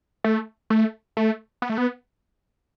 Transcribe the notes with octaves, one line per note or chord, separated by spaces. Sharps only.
A3
A3
A3
B3
A3
B3